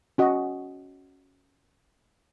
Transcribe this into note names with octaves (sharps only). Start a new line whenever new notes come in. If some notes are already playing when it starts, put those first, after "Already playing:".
C#4 F#4 D#5